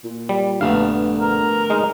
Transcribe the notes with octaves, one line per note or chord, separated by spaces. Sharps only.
A#2
G3
A#1 G2 D3 A3 B3 F5
A#4
G#3 D#4